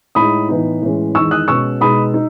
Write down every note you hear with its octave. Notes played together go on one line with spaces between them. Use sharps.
A2 G#3 D#4 B5 D#6
A2 E3 B3 D#4
A2 E3 G#3 C#4
E2 D#3 G#3 D#4 C#6 E6
D#6 F#6
B2 G#3 C#4 C#6 E6
B2 G#3 D#4 B5 D#6
D#4